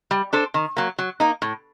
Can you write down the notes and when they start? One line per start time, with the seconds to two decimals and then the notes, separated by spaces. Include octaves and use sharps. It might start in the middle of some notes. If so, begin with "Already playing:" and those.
0.11 G3
0.33 D4 A4 C5
0.54 D#3
0.77 F#3 A#3
0.99 F#3
1.20 A#3 D#4
1.42 A2